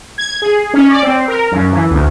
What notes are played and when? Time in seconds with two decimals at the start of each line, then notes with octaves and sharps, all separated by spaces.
0.18 G#6
0.42 G#4
0.74 C#4
0.90 D5
1.03 C4
1.28 A#4
1.52 F#2
1.72 E3
1.91 D2